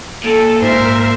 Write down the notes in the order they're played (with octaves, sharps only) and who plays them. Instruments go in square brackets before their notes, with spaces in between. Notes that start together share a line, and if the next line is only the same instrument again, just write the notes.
[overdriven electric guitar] A#2 [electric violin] A4
[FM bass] G#2 [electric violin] A#4 E5 [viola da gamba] C5